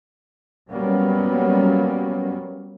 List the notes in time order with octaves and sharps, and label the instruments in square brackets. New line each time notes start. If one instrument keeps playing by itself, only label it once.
[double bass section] F#3 G3 A#3 B3 C#4